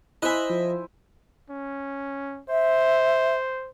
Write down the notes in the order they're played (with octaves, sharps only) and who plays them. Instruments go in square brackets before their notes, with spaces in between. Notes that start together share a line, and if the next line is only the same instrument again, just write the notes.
[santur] E4 C5 G#5 [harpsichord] D#5 E5 [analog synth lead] F#6
[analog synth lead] F3
[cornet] C#4
[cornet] C5 [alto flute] E5